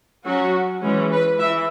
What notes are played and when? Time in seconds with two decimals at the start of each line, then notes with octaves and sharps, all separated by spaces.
0.25 F#3 C#4 F#4
0.82 E3 G#3 C#4
1.11 B4
1.39 E3 E5